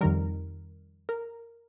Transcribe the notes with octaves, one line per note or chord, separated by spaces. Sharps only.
F2 D#3 G3 A#4
A#4